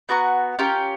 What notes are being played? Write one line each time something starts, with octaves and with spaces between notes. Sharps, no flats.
B3 F#4 A#5 C#6
C#4 F4 G4 A#4